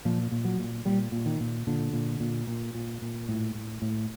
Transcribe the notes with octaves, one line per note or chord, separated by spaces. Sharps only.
A#2 F3
A#2
F#3
A#2
A#2 G3
A#2
D#3
A#2
A#2 D3
A#2
A#2
A#2
A#2
A#2
A2
A2
A2